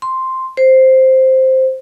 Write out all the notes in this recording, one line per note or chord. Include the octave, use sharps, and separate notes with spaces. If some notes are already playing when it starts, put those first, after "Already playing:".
C6
C5